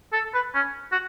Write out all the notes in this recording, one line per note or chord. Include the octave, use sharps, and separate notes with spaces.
A4
B4
C#4
F#4